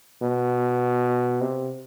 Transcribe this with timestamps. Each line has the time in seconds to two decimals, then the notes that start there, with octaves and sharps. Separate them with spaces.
0.22 B2
1.41 C3